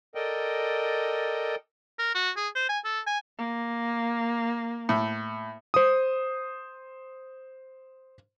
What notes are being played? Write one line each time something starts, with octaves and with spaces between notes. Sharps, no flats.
A4 A#4 D5 D#5 G5
A#4
F#4
G#4
C5
G#5
A4
G#5
A#3
A2
C5 D#6